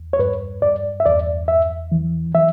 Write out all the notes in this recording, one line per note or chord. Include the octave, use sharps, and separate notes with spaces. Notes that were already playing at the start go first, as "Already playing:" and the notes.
Already playing: E2
C#5
G2 B4
G2 D5
E5
E2 D5
E2 E5
E3
E3 E5